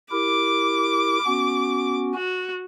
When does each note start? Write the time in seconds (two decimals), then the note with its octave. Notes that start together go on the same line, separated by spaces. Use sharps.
0.12 E4 G4 A#4 D6
1.26 B3 C#4 F#4
2.15 F#4